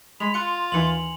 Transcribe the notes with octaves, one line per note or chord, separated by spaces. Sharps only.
G#3 B5 C6 F7
F4 F#6 C#7
D#2 E3 G#5 C#7 F#7